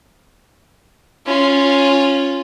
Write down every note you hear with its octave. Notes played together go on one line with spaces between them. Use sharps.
C#4 F4